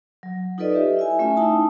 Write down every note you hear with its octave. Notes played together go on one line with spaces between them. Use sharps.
F#3
D#4 F4 A4 B4 D5 D#5
G4 E5
E4 E5 G#5
A3 C#4 F4 E5 G#5
D#4 E4 G5 A5 D#6